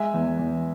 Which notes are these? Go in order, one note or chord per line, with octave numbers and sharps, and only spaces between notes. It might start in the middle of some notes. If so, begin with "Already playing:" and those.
Already playing: G#3 E5 G#5
E2
E2